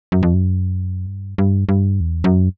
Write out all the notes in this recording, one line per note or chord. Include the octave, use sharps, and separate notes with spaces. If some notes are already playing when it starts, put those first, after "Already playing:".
F#2
F2
F#2
G2
G2
G2
E2
F#2